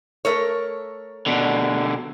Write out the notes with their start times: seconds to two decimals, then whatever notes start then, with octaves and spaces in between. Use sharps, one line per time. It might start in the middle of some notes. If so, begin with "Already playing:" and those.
0.25 A3 A#4 C#5
1.26 B2 D3